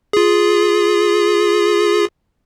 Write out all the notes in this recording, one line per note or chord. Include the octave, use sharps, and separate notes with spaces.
F4 G#4